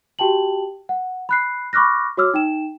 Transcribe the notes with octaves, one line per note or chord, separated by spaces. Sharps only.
F#4 G4 G5 A5 F#7
F#5
B5 F#6 C7
B5 C#6 D6 F6 F#6 A#6
F#4 C#5 D6 E6 F6
D#4 G5 E7